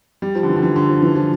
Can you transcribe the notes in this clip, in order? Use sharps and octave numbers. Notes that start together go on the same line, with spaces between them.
G3
F3
D3
E3
D3
E3
D3
F3
E3
F3